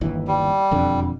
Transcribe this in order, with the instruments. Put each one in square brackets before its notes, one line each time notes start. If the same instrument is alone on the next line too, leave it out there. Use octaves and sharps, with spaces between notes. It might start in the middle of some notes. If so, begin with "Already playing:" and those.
[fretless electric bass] G1 D#2 E3
[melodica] G3
[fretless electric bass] E1 F2 D3